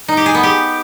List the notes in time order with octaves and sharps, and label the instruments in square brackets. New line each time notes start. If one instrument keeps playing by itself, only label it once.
[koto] D#4
G4
G#4
B3
G4